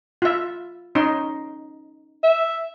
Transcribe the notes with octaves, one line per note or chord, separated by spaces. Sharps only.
F4 E5
C#4 D#4 C6
E5